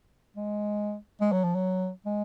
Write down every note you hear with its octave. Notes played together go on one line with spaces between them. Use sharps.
G#3
G#3
F#3
F3
F#3
G#3